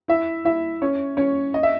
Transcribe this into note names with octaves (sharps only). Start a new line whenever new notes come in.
E4 E5
E4 E5
C#4 C#5
C#4 C#5
D#5
E5